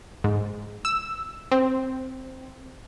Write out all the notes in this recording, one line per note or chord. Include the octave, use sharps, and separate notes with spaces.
G#2
E6
C4